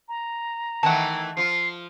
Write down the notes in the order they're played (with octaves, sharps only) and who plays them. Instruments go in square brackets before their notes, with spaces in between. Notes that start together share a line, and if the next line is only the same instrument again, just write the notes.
[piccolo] A#5
[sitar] D#3 E3 A3 [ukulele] F#5 A5
[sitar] F3 F4 [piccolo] C7